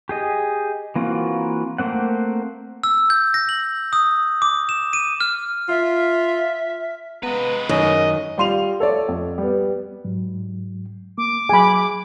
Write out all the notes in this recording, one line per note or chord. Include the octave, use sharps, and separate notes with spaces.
G4 G#4 D#5
E3 A#3 C4 F4 F#4
A3 A#3 C4 F#5
E6
G6
A#6
F#7
D#6
D6
E7
D#7
F6
F4 E5
G#3 B3 B4 A#5
F#2 D#3 D#5
G3 F4 C6 D#7 F7
A4 C#5 D5 E5
F2
G3 B3
G#2 F#3
A#3 D6
F#3 G#4 G#5 B5